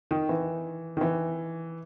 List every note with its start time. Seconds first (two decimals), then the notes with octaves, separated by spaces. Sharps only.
0.11 D#3
0.29 E3
0.97 D#3
1.01 E3